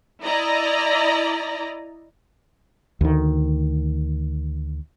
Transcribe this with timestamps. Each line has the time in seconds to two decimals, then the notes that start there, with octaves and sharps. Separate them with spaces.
0.23 E4 D5 D#5 A#5
3.01 D2 D#3